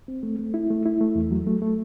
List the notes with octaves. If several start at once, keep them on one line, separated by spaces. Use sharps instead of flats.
C4
A3
A3
E4
A3
E4
A3
E2
F#3
A3
A3